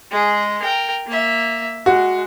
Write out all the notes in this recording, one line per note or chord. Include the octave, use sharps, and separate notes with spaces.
G#3 G#4
A#4 G5
A#3 E5
G#3 F#4